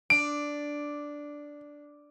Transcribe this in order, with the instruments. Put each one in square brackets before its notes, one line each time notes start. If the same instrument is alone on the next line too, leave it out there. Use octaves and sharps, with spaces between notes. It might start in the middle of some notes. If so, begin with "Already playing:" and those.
[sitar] D4 [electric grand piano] D7